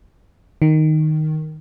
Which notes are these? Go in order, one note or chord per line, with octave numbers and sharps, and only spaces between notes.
D#3